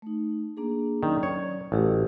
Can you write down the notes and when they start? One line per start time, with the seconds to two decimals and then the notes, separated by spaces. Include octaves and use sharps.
0.02 A3 D#4
0.57 A#3 D4 G#4
1.03 D#3 F#3 C#4 D5
1.23 C#5
1.72 A1 F#4 G4 C#5